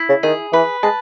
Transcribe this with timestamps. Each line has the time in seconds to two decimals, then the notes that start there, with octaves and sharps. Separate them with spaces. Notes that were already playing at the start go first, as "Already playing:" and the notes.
Already playing: E4
0.09 C#3
0.23 D#3 G#4
0.53 E3 B4
0.83 G#3 A5